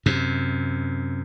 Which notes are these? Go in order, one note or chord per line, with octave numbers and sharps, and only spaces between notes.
F#2 C3